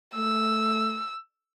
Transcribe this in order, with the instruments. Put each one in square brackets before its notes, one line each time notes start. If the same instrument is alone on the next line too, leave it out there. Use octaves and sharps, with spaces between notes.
[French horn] A3 [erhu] E6